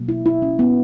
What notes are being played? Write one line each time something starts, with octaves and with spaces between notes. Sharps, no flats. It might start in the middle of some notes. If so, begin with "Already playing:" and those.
Already playing: B2 F#3 A#3
E4
E4
C#4
B3